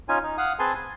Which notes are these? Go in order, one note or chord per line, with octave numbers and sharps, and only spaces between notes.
C#4 D#4 F4 G#5
D#4
F5 F#5 D#6
C4 G#4 B4 G#5 A5 C6
G#5